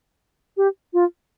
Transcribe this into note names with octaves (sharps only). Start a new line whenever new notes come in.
G4
F4